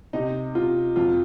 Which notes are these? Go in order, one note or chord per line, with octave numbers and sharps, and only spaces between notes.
C3 D#4
C3 F4
F2 F4